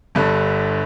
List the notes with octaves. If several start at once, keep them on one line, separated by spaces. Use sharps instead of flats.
G1 G2 D3